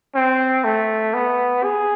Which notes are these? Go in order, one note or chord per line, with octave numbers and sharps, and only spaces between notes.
C4
A3
B3
G#4